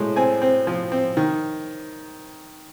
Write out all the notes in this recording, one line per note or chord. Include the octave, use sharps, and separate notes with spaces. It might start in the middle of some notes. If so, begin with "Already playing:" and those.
Already playing: A2 G#3
C4 G#5
C4
F3
C4
D#3